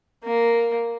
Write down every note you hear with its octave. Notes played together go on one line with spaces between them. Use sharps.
A#3